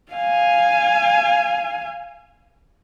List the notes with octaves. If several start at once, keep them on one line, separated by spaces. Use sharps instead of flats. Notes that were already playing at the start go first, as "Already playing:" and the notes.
F5 G#5